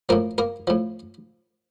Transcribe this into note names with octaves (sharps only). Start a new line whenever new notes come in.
A2 F3 A#3 A#4
A#3 A#4
A2 F3